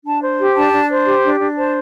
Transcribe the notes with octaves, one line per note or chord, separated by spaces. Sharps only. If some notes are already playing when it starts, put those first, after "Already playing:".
D4 A5
C5
G4
D4 A5
D4
C5
G4
D4
D4
C5 A5